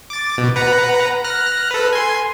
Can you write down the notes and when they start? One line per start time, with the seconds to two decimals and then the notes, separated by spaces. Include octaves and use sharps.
0.10 D6 A6
0.38 B2
0.56 B4 F#5 A#5
1.24 F6 F#6 A#6
1.71 A4 B4
1.93 G#5 C6